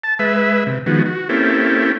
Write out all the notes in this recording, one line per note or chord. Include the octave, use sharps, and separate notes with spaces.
A5
G#3 B4 E5
C3
D#3 F3 G#3 B3 F#4
F#4
A#3 C4 C#4 E4 G4 A4